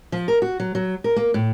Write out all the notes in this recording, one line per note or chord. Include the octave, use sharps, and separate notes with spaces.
F3
A#4
F#4
F#3
F#3
A#4
A#3
A2